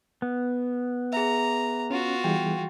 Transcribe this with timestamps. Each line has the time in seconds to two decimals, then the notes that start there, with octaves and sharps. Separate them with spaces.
0.22 B3
1.13 G#4 E5 A#5
1.90 C#4 F4 F#4
2.24 E3 G3 G#4 G5